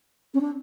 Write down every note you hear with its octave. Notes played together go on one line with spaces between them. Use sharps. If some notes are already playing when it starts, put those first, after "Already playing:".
C#4
D4